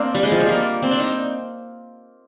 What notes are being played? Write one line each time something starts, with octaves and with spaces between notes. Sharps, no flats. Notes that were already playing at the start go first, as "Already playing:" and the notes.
Already playing: A#3 C4 D4
G3
G#3
F3
G3
A#3
C4
D4
D#4